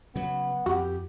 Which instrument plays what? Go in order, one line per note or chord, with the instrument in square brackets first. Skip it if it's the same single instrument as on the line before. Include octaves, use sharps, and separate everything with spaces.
[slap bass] C#3 F#3 [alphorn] B3
[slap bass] F2 [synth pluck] F#4 [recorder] G4